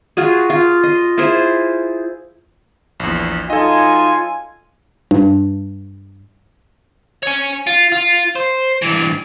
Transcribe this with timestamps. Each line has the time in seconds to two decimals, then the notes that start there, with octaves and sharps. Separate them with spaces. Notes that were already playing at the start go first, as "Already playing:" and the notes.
0.17 F4 F#4 G#4
0.50 F4
0.83 D#5 C6
1.18 E4 F4 G#4 C5
3.00 A#1 E2
3.50 F#3 D#4 F4 A4 D#5 G#5
5.11 G2
7.23 C#5 G#5
7.67 F4
7.92 F4
8.36 C5
8.82 G2 E3